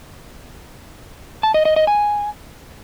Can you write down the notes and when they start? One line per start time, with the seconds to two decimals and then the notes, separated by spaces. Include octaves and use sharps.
1.43 A5
1.54 D#5
1.65 D#5
1.76 D#5
1.87 G#5